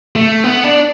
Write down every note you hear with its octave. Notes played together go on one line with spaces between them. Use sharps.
A3
B3
D4